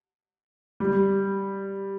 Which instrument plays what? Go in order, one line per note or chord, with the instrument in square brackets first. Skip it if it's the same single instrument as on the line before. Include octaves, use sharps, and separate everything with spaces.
[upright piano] G3